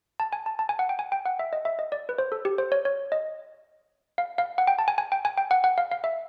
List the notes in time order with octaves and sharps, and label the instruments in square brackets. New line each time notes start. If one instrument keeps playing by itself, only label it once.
[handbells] A5
G#5
A5
A5
G#5
F#5
G5
G#5
G5
F#5
E5
D#5
E5
D#5
D5
B4
C5
A4
G4
C5
C#5
C#5
D#5
F5
F5
F#5
G5
A5
G#5
G#5
G5
G#5
G5
F#5
F#5
F5
F5
E5